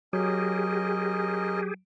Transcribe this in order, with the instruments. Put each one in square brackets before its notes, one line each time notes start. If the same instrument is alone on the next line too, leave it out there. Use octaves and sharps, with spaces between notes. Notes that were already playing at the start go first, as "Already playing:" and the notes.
[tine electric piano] F#3 [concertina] C#4 A#4 D#5 [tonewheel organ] G4 G#4